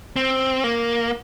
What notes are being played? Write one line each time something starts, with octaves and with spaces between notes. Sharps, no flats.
C4
A#3